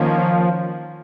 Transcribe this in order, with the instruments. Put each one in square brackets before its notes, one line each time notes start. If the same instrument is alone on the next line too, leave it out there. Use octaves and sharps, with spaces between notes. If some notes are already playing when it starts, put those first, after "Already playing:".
Already playing: [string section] D#3 A#3 C#4 [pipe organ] F3